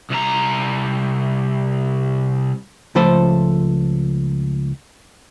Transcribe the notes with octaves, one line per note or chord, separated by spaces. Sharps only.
C2 A#5
C#2 F3 A3 A4 C5 B5